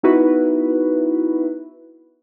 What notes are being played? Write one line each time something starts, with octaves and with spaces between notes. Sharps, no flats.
B3 D#4 E4 F#4 B4